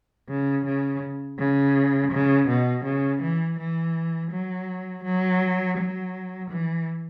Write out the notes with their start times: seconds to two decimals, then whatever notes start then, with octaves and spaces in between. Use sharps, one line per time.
0.28 C#3
0.64 C#3
1.37 C#3
2.11 C#3
2.47 B2
2.84 C#3
3.20 E3
3.57 E3
4.31 F#3
5.03 F#3
5.76 F#3
6.50 E3